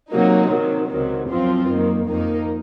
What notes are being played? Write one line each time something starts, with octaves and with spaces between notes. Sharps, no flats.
C3 F#3 A#3 D#4
C3 D#3 F#3
C#2 C3 D#3 F#3
F#2 F3 C4 F4
F#2 D#3 A#3
F2 D#3 A#3 D#4